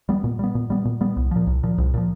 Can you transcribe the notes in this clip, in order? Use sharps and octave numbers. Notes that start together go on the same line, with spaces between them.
G3 B3
A#2
G3 B3
A#2
G3 B3
A#2
G3 B3
C2
A#2 F3
C2
A#2 F3
C2
A#2 F3